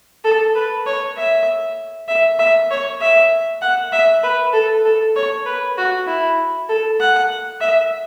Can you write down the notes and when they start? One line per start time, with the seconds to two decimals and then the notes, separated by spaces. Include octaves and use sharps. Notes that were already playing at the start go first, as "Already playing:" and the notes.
0.24 A4
0.55 B4
0.86 C#5
1.17 E5
2.08 E5
2.39 E5
2.70 C#5
3.01 E5
3.62 F#5
3.92 E5
4.23 B4
4.54 A4
4.85 A4
5.16 C#5
5.46 B4
5.77 F#4
6.07 E4
6.69 A4
7.00 F#5
7.61 E5